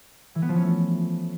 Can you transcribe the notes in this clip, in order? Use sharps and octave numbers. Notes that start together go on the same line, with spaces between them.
E3
B3
F3
C#4
A3